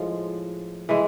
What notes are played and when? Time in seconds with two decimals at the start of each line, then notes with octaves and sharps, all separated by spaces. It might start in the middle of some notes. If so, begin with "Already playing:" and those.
Already playing: A2 F3 G#3
0.89 E3 G#3